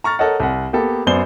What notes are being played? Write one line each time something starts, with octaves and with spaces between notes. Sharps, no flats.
A#5 C#6 F6 A6
A4 A#4 C#5 D#5 F#5
C2 F#5
A#3 B3 G4 A4
F#2 B3 C5 D5 G7